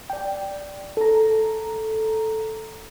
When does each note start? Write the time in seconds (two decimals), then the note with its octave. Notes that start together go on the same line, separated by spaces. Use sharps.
0.10 D5 G5
0.97 A4 A#5